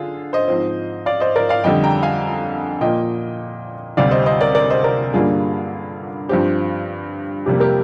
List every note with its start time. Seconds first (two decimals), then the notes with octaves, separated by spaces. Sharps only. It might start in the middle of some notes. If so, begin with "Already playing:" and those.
Already playing: D3 F4 G#4
0.33 C5 D#5
0.48 G#2 F3 C4
1.06 D5 F5
1.20 C5 D#5
1.36 A#4 D5
1.49 D5 F5
1.64 F2 D3 G3 D#5 G5
1.84 G5 A#5
2.03 F5 G#5
2.81 A#2 F3 A#3 D#5 G5
3.97 D2 C3 G3 D5 F5
4.11 C5 D#5
4.26 C5 D#5
4.41 A#4 D5
4.55 A#4 D5
4.70 C5 D#5
4.84 A#4 D5
5.13 G2 D3 G3 A#3 F4 G#4
6.29 G2 F3 C4 G4
7.46 F2 C3 G3 A#3 G4
7.60 G4 A#4